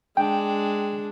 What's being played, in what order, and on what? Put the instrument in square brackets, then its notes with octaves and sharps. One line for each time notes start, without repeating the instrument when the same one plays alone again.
[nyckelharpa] G#3 D4 [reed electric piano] G5